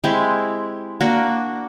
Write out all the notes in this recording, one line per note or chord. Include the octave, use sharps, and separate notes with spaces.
G#3 C4 E4 G4
A#3 D4 F#4